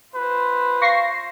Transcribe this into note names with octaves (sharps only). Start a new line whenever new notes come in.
F4 B4 C5
F5 C#6 A#6 C7